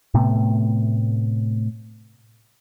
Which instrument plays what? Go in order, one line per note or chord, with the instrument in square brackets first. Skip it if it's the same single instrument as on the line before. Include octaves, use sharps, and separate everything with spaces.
[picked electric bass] A2 C3 A3 B3